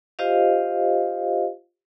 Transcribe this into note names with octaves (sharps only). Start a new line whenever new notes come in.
F4 G4 C5 D#5 F5